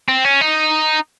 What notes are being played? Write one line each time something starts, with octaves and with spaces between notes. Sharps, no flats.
C4
C#4
D#4